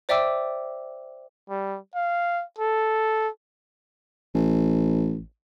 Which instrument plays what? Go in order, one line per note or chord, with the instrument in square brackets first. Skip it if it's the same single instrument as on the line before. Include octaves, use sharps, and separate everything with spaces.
[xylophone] C5 D5 E5 G5 D6 E6
[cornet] G3
F5
A4
[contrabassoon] A1